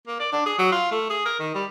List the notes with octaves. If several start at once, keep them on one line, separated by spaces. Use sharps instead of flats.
A#3
D5
D4
G#4
F#3
F4
A3
G#4
A#4
D#3
G3